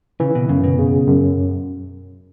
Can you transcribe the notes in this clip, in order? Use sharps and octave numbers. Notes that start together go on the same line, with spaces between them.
C#3 E3
B2
F#2 C#3
B2
C#3
F#2